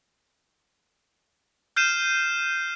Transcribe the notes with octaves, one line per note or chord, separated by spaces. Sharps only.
F6 G6 C7 D#7 E7